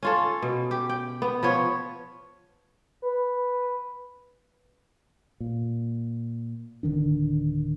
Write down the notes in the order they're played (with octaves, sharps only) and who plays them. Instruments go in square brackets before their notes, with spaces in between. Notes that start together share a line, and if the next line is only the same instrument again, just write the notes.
[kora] C#4 F4 A4
B2
G4
G5
B3
F3 B3 C#5
[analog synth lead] B4
[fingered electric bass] A#2
D1 D3 D#3 D4